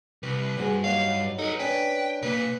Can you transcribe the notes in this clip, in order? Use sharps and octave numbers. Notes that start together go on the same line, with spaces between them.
C2 B4
G2 C4 F#4 G#4
D#2 F#3 F5 F#5
D#4 A4 B4
C#4 D4 B4 G5
B2 A#3 B4